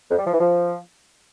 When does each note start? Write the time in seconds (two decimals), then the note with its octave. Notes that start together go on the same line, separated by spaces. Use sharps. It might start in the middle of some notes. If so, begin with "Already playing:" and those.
0.11 F2
0.18 G3
0.25 F3
0.33 E3
0.40 F3